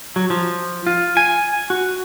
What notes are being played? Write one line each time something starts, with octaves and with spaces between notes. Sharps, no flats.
F#3
F3
F4
G#5
F#4